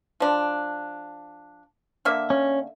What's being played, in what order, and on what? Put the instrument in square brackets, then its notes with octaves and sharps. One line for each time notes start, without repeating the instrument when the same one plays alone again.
[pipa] F3 D4
D3 A#3 E5
[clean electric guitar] C#4